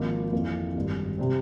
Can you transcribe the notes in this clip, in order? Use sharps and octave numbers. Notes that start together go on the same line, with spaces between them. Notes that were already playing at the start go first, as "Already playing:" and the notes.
Already playing: G#1 G#2 F3 A#3 F4
F2 E3 A#3
G#1 G2 G3
C3 G3 C4